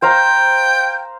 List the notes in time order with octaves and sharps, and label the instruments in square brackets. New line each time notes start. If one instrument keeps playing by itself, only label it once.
[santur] C5 F5 A#5 [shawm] G5